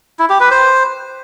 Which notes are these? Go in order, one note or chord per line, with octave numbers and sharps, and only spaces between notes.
E4
G4
B4
C5